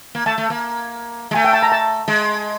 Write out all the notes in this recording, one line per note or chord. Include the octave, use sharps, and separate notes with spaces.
A#3
A3 A5
A3
A#3
G#3
A3 G#5
G5
A5
A#5
A5
G#3